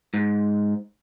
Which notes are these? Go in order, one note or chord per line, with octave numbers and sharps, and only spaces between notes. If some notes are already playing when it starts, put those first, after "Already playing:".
G#2